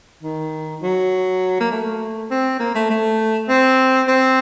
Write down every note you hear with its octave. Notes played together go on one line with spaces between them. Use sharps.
D#3
F#3
A#3
A3
C4
A#3
A3
A3
C4
C4